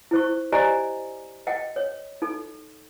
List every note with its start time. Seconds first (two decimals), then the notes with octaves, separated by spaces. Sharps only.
0.11 E4 C5 C#6
0.52 G4 C5 D5 D#5 G#5 A#5
1.47 D#5 F#5 G5
1.76 C#5
2.22 D#4 A4